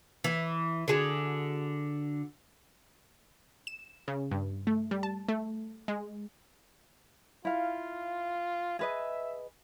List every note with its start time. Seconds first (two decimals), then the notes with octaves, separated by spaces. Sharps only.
0.24 E3
0.88 D3 F#4 G#4
3.67 E7
4.08 C#3
4.31 G2
4.67 A3
4.91 G3
5.03 A5
5.28 A3
5.88 G#3
7.45 E4 F4 F5
8.79 G#4 B4 D#5 E5